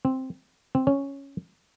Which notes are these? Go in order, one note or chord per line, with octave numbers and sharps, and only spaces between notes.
C4
C4
C#4